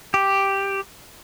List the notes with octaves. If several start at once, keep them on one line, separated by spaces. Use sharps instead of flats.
G4